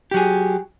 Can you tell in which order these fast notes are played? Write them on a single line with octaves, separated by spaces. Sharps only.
G4 F#3 G#4